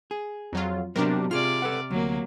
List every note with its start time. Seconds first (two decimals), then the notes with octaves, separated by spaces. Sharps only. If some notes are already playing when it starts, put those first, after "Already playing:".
0.11 G#4
0.53 F2 F#3 F4
0.96 C3 F#3 B3 C4 D4 G4 A#4
1.31 C3 F4 G#4 D5 F6
1.62 A4 B4 F#5
1.91 D2 F#3 A#3